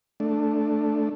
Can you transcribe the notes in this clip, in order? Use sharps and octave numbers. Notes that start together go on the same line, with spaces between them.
A3 D4